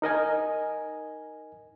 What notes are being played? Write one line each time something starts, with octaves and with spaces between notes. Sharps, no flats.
D#4 A#4 D#5 G#5